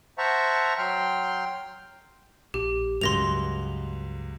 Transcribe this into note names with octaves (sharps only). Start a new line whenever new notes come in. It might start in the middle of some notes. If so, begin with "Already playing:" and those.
C5 E5 F#5 A5 A#5 C#6
F#3 G5 C6 F6
A#1 G4
C#2 G2 F#3 C6 A#6 F7